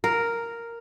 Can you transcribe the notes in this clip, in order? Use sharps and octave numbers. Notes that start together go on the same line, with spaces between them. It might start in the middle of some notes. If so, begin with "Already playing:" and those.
A#4